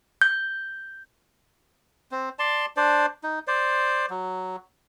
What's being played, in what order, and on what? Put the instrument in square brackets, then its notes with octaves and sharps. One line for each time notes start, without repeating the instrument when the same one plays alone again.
[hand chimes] G6
[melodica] C4
D5 A5 C6
D4 C5 D5
D#4
C5 D5
F#3